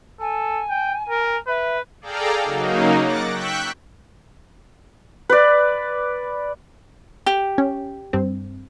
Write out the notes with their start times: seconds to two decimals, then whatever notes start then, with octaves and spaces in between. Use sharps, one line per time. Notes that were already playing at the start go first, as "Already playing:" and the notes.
0.20 A4 G#5
0.69 G5
1.09 A#4
1.47 B4 E5
2.01 G#4 A4 D5 F5 G5 A#5
2.42 C#3 F#3 A#3 D#4
3.01 D6 F#6 A6 A#6 C#7
3.31 G5 C#6 E6 F#6 G6 B6
5.29 B4 D5
7.26 G4
7.58 C#4
8.13 G2 C4